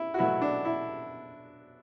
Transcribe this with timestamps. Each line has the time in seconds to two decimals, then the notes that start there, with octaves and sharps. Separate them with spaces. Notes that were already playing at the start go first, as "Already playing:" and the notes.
Already playing: E4
0.14 F#4
0.18 B2 F#3 A3 E4
0.42 D4
0.65 E4